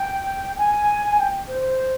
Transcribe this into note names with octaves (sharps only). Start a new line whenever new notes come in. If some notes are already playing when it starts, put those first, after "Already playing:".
Already playing: G5
G#5
G5
C5